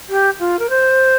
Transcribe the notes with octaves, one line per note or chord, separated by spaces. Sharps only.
G4
F4
A#4
C5